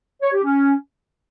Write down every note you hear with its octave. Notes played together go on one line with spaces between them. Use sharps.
C#5
G4
C#4